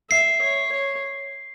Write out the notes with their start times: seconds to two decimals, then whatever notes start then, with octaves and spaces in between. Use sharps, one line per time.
0.10 E5 C7
0.42 C#5
0.72 C#5